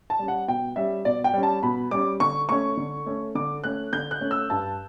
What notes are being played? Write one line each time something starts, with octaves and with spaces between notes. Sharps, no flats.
A5
G3 C#4
F#5
B2 G5
G3 C#4 E5
B2 D5
G5
G3 C#4
A5
B2 B5
G3 C#4 D6
D3 C#6
A3 C#4 C#6
D3
A3 C#4
D3 D6
A3 C#4 F#6
D3 G6
F#6
A3 C#4
E6
G2 A5